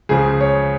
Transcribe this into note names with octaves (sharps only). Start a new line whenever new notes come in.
C#2 C#3 F3 G#4
C#5